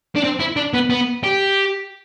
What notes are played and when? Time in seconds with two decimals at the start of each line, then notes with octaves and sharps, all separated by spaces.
0.16 D4
0.24 C4
0.40 E4
0.56 D4
0.74 B3
0.90 B3
1.24 G4